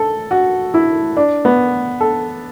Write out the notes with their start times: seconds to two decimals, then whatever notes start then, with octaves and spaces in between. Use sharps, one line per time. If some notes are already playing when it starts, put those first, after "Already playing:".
Already playing: A4
0.31 F#4
0.74 E4
1.17 D4
1.45 B3
2.01 A4